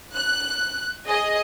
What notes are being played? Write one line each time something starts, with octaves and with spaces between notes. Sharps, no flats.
F#6
G#4 D#5